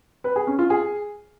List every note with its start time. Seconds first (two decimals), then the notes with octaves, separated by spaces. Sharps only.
0.24 B4
0.36 G#4
0.47 C#4
0.59 F4
0.70 G#4